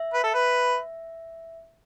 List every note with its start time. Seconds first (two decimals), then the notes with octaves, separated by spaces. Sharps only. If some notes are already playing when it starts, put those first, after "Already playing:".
Already playing: E5
0.14 B4
0.24 A4
0.34 B4